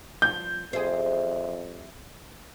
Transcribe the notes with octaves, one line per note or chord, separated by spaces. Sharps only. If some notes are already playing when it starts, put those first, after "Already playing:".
G2 F3 C4 G6
F2 C4 G4 G#4 C5 E5